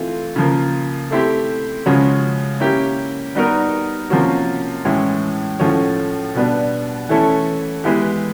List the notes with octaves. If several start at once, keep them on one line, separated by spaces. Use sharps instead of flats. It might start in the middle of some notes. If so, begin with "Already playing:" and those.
Already playing: E3 A3 C4 F4
C#3 F3 A#3
A3 C4 E4 G4
C#3 F3 G#3 C#4 F#4
A#3 C#4 E4 G4
G3 B3 D#4 F#4 A#4
C3 F3 A#3 C#4 F#4
A2 E3 G#3 C#4 E4
A2 F3 A3 C#4 F#4
B2 G3 B3 D4
E3 A3 C#4 E4 A4
E3 G#3 B3 E4 G4